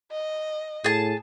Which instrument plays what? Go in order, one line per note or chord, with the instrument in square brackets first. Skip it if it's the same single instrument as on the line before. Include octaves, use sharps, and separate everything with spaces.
[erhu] D#5
[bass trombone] A2 [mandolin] G#4 A5